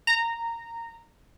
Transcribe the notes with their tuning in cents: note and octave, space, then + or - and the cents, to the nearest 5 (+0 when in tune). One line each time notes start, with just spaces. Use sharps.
A#5 -10